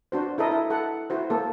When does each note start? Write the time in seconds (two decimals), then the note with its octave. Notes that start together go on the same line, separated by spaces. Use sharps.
0.12 D4 F#4 C5
0.38 E4 A4 A#4 D#5
0.51 E4
0.70 A4 F#5
1.10 E4 F#4 C5
1.30 A#3 A4